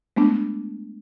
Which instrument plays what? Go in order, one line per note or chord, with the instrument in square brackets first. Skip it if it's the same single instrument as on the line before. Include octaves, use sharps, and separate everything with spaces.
[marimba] G#3 A3 B3 D4